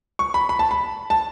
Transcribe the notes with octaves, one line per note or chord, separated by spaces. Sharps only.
C#6
B5
B5
A5
B5
A5